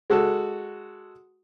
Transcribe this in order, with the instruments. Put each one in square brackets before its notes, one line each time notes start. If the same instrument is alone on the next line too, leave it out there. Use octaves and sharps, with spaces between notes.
[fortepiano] G#3 F#4 A4